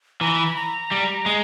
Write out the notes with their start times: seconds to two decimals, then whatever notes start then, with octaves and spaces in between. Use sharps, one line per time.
0.21 E3 A#5
0.33 B5
0.45 B5
0.56 A#5
0.91 G3
1.26 G#3